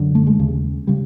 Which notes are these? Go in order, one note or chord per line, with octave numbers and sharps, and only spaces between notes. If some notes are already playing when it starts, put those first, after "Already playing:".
Already playing: F#2 D3
A3
G#3
D#2 C#3
C#3 G3